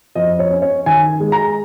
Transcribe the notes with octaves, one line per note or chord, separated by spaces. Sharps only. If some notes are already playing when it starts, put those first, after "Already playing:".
F2 D#5
C#5
C#4
C#5
D#3 G#5
G#3
A#5